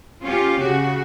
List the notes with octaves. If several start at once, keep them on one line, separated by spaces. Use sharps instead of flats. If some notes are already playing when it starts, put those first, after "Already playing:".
C#4 F4 G4
C#3 F#4